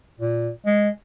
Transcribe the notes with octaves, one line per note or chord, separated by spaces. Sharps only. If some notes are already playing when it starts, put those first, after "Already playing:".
A#2
G#3